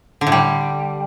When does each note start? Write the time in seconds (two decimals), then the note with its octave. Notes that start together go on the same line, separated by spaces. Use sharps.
0.21 D3
0.27 A2
0.32 G3